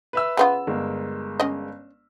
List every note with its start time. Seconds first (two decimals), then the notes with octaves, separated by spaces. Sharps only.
0.13 B4 E5 E6
0.37 C#3 B3 F4
0.67 G1 G#3 A#4
1.40 C#4 D#5